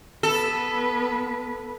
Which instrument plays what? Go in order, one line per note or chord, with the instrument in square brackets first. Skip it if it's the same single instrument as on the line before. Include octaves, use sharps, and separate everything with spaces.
[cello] B3 B4 [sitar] A4